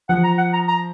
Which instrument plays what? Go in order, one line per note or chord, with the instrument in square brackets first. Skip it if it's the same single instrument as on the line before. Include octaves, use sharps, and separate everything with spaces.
[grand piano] F3 [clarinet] F#5
[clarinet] A#5
F#5
A#5
A#5